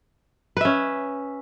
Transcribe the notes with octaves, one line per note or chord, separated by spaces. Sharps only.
C#4 B4 E5